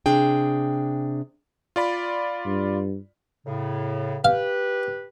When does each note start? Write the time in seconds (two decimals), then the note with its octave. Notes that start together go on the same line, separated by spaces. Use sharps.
0.06 C3 D4 G#4 G5
1.76 F4 D5 B5
2.46 G2
3.46 A2 C#3
4.25 G4 B4 F5